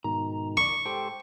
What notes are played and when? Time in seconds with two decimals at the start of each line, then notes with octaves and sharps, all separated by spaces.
0.04 G#2 B2 D#3 A#5
0.57 A#4 D5 C#6
0.85 G#2 G4 A4 C5 G5